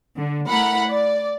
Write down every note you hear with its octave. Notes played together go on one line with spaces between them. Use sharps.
D3
A3 E4 A#4 F#5 B5
D5